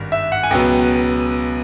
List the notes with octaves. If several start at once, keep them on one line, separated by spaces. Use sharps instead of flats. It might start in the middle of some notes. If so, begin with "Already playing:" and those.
Already playing: G#1 G2 D#3
E5
F#5
G#5
C#2 B2 F#3 B3 G5